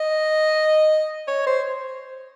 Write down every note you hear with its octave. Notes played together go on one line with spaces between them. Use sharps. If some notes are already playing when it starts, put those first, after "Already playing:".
Already playing: D#5
C#5
C5